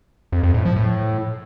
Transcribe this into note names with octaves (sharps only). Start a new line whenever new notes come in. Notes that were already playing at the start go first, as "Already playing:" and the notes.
F2
F2
A2
F3
A2